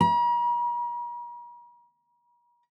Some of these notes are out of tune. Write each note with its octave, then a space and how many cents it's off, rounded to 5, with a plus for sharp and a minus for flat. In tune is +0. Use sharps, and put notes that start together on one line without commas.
A#5 +45